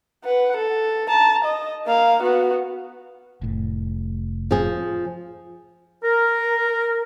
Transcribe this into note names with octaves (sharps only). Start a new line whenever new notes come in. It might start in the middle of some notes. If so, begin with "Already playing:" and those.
B4 F#5
A4
A5 A#5
D#5
A#3 F5
B3 F#4
F1 A2
F3 G#4
A#4